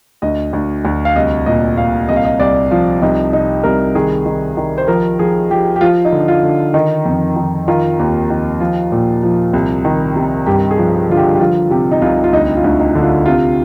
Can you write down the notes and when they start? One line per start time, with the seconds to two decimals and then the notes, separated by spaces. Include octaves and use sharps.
0.22 D2 D#5
0.53 D2
0.85 D2
1.05 F5
1.16 C2 D#5
1.46 A#2 D#5
1.77 A#2 F5
2.09 C2 D#5
2.16 F5
2.25 D#5
2.40 C2 D5
2.71 F3 F4
3.02 C2 D#4
3.33 C3 D#4
3.63 C2 A#4
3.95 D#3 G#4
4.26 D#3
4.57 D#3
4.78 C5
4.88 F3 A#4
5.19 F3 G#4
5.50 F3 G4
5.76 G4
5.81 F3 F4
6.05 D#4
6.12 D3
6.28 F4
6.43 D3
6.74 D#3 D#4
7.06 F2
7.36 D#3
7.68 D#3 F4
7.99 D#2
8.30 D#3
8.60 F3 F4
8.92 A#2
9.23 F3
9.53 C2
9.85 D#3
10.16 C3
10.46 G2 G4
10.71 G#4
10.78 F3
10.94 G#4
11.09 D3 F4
11.17 G4
11.34 G4
11.39 F3 F4
11.70 C3 G4
11.91 D#4
12.02 C2 F4
12.24 F4
12.33 D2 D#4
12.57 F4
12.64 D2
12.79 D#4
12.95 D3
13.03 F4
13.26 C3 F4